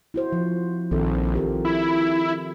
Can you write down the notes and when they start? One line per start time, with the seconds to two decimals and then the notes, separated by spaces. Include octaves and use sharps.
0.14 E4 F#4 C5
0.32 F3
0.91 A#1 D#3 C4 A4
1.35 F4 G4 A#4
1.65 E4